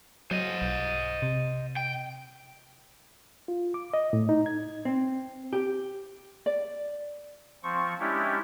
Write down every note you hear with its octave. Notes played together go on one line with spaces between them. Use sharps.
F#3 C5 D#5
B1
C3
G5
F4
D6
D#5
A2
D#4
G#6
C4
G4
D5
F3 C4 C#6
G#3 C#4 D4 E4 G4